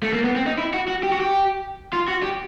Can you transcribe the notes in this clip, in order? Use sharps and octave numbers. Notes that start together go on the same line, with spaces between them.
A3
A#3
B3
C4
D#4
E4
F#4
F#4
G4
F#4
G4
F4
F#4
G4